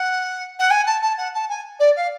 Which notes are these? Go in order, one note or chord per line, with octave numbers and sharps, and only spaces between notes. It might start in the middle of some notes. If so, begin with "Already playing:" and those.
Already playing: F#5
F#5
G#5
A5
A5
F#5
A5
G#5
D5
F5